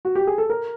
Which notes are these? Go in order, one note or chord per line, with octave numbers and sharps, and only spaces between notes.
F#4
G4
G#4
A4
A#4